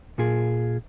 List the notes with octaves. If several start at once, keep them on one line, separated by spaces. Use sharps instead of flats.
A#2 F4 G#4